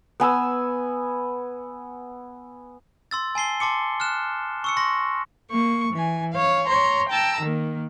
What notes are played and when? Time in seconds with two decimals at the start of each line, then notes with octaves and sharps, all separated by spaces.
0.20 B3 G#5 E6
3.11 C6 E6 A6
3.35 G#5 A5 C7 G7
3.60 A5 C6 D6 C#7
4.00 F6 F#6 E7
4.64 C#6 E6 C#7
4.77 C6 C#6 A#6
5.51 A#3 C#6
5.93 E3 G#5
6.32 C#5 F5
6.66 C#5 A#5 C6
7.09 G5 A5 A#5 E6
7.41 D#3 A#3